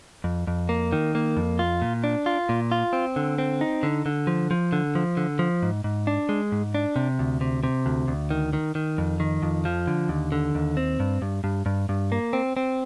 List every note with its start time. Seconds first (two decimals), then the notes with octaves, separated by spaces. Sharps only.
0.24 F2
0.47 F2
0.69 A#3
0.92 D#3
1.15 A#3
1.37 F2
1.59 F4
1.82 A#2
2.04 D4
2.26 F4
2.49 A#2
2.72 F4
2.93 C4
3.16 D3
3.38 C4
3.61 D#4
3.83 D3
4.06 D3
4.27 F3
4.51 F3
4.73 D3
4.95 F3
5.17 D3
5.39 F3
5.63 G#2
5.84 G#2
6.07 D4
6.29 G#3
6.52 G#2
6.74 D4
6.96 C3
7.19 D2
7.41 C3
7.64 C3
7.86 D2
8.08 D2
8.30 D#3
8.53 D#3
8.75 D#3
8.98 F2
9.20 D#3
9.43 F2
9.65 F3
9.87 D3
10.09 D#2
10.32 D3
10.55 D#2
10.77 C4
11.00 G2
11.22 G2
11.44 G2
11.66 G2
11.89 G2
12.12 A#3
12.33 C4
12.57 C4